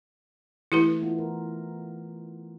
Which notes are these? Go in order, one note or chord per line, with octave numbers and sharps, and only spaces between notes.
E3 A3 E4 G4 B4
B3 F4
A#4